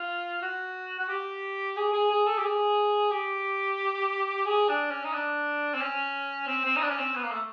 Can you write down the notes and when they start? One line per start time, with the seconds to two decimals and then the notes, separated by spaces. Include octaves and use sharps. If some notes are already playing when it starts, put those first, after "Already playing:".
Already playing: F4
0.42 F#4
0.99 F#4
1.09 G4
1.77 G#4
1.93 G#4
2.11 G#4
2.27 A4
2.38 G4
2.44 G#4
3.11 G4
4.46 G#4
4.69 D4
4.91 C#4
5.04 D#4
5.13 D4
5.74 C4
5.81 C#4
6.47 C4
6.65 C4
6.76 D#4
6.82 D4
6.90 C#4
6.99 C4
7.15 B3
7.23 A#3
7.32 A3